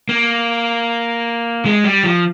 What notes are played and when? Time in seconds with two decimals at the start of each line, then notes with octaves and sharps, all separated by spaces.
0.09 A#3
1.65 G#3
1.84 G3
2.04 F3